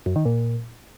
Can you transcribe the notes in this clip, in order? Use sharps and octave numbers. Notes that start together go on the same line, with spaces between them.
F#2
D#3
A#2